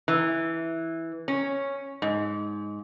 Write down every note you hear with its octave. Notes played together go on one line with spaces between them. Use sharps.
E3
C#4
G#2